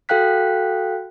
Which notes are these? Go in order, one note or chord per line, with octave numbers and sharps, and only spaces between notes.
F#4 A4 F5 G5 F#6 B6